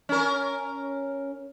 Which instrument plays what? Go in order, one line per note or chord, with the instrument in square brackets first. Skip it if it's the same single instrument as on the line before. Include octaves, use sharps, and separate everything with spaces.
[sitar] C#4 A#4